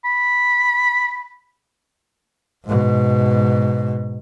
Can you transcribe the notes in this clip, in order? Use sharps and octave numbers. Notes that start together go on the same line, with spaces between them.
B5
G#2 B2